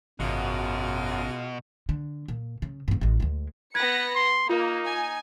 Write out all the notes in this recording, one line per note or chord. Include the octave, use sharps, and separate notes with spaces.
G#1 F#2 B2 G#3 F4 F#4
D3
A#2
C#3
G2 C4
A1 G#3
D2 G#3
B3 B4 G#6 A#6 C#7
C6
A#3 D#4 F4
G#5